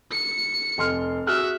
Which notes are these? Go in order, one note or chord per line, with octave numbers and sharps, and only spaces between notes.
C#7
F1 C6 F6
F#4 G#4 E5 F6 F#6